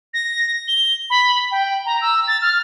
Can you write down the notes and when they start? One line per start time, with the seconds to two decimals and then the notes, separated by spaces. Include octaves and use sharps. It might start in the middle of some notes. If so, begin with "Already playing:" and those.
0.14 A#6
0.68 G7
1.10 B5
1.51 G5
1.86 A#5
2.01 E6
2.28 A6
2.42 F6